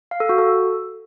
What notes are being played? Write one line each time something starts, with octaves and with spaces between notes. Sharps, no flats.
F5
A4
F#4
A4